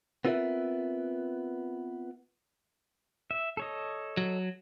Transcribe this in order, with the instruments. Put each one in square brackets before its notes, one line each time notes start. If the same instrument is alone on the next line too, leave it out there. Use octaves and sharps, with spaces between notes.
[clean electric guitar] B3 C4 F4 A#4 B4 E5
[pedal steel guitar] E5
A4 C#5 D#5
[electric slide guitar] F#3